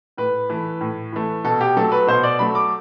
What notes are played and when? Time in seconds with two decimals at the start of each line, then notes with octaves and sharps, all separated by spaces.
0.17 A2 B4
0.49 E3 A3
0.81 A2
1.13 E3 A3
1.44 B2 A4
1.61 G4
1.77 F#3 A3 A4
1.92 B4
2.07 B2 C5
2.23 D5
2.39 F#3 A3 B5
2.55 D6